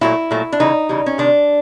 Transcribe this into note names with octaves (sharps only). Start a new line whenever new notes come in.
A#2 F#3 A3 E4
A#2 F#3 A3
D4
C#3 E3 G3 D#4
C#3 E3 G3
C#4
C3 D#3 G3 D4